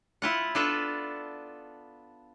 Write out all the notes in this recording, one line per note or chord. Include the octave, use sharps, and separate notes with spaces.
E4 F4 F#5
B3 D4 F4 A4 B4